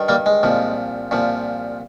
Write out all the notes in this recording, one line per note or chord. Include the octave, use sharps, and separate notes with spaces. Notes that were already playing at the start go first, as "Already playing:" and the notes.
Already playing: G2 D#3
G3 A#3
G#3
C2 A#2 F3
C2 A#2 F3